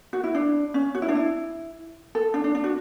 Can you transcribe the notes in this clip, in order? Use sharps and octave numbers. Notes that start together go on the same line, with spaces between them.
F#4
E4
D4
C#4
F#4
E4
D4
E4
A4
D4
D4
D4
F#4